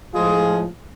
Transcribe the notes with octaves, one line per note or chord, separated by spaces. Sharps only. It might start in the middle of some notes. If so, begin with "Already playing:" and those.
A2 F3 G#3 F4 G#4